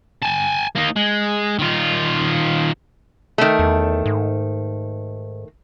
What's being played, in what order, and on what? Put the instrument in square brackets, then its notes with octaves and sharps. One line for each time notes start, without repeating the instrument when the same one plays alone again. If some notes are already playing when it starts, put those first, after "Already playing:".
[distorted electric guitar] G#5 A5
A#3 D#4
G#3
D#3 F4
[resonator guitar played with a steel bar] D#3 A3
[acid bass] E2
G#2